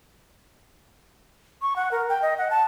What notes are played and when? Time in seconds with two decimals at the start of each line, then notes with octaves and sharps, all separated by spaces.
1.62 C#6
1.76 F#5
1.91 A#4
2.09 G5
2.22 D#5
2.38 F#5
2.50 A5